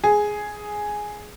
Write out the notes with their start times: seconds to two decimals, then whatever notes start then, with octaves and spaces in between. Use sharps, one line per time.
0.04 G#4